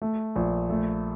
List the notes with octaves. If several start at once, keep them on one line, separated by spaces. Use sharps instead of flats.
A3
A#1
A3